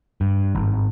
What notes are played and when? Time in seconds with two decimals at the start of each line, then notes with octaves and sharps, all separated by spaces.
0.21 G2
0.55 G#1